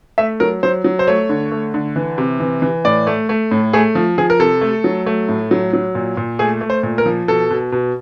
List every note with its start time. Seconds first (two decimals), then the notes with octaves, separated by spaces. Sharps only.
0.18 A3 E5
0.40 F#3 A#4
0.63 F#3 C5
0.84 F#3
0.99 C5
1.07 A3 C#5
1.29 D3
1.52 A3
1.74 D3
1.96 E3
2.18 C3
2.40 E3
2.62 E3
2.85 A2 D5
3.07 A3
3.29 A3
3.51 A2
3.73 A3 G#4
3.95 F3
4.18 F3 G#4
4.30 A#4
4.40 C3 A4
4.61 A3
4.84 F#3
5.06 A3
5.29 A2
5.51 F#3
5.73 F#3
5.95 A#2
6.17 A#2
6.39 A3 G#4
6.61 A3
6.70 C5
6.83 A#2
6.98 A#4
7.06 F3
7.28 B2 A4
7.50 B2
7.72 B2